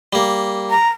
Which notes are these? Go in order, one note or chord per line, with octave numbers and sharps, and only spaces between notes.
G3 A#3
A#5